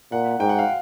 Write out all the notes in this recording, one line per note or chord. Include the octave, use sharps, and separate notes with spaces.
A#2 F#5
G#2 G5
F#5
F5